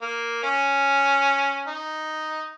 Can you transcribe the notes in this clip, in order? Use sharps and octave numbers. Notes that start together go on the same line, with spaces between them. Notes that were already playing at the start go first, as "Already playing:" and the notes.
A#3
C#4
D#4